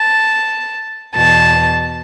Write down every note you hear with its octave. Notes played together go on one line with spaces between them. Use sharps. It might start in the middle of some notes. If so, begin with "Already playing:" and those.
Already playing: A5
E2 B2 A5